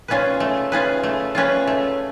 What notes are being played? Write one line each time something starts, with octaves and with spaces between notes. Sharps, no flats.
C#4 F4 G#4 B4
A3
C#4 F4 G#4 B4
A3
C#4 F4 G#4 B4
A3